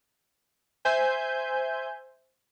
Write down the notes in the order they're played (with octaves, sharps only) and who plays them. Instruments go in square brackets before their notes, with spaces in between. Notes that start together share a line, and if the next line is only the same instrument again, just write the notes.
[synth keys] C5 E5 G#5 G6